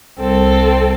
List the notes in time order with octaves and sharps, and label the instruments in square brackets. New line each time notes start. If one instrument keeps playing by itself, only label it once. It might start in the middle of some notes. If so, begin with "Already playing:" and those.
[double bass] C2 [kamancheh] C4 A4